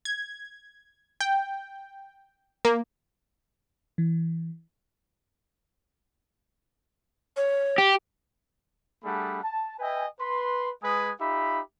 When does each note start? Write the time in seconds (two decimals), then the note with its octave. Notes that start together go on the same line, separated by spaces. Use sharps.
0.05 G#6
1.21 G5
2.65 A#3
3.98 E3
7.37 C#5
7.78 G4
9.05 G3 A3 D4 G#4 F#5 B5
9.43 A5
9.79 B4 D#5 E5 G5 G#5
10.20 B4 C6
10.83 G#3 B4 G#5 D#6
11.20 D#4 F4 G4 E5 B5